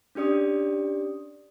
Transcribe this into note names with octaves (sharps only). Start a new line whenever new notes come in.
C#4 D4 G4 D5 D#6